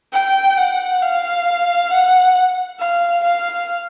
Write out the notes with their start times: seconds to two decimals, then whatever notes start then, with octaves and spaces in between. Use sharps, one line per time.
0.13 G5
0.57 F#5
1.02 F5
1.90 F#5
2.79 F5
3.23 F5